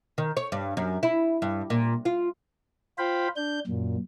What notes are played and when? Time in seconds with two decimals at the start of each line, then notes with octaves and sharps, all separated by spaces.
0.18 D#3
0.37 C#5
0.52 G2
0.77 F#2
1.03 E4
1.42 G2
1.70 A#2
2.05 F4
2.98 F4 C5 F5 G5 B5
3.36 D4 G6
3.67 F#2 A#2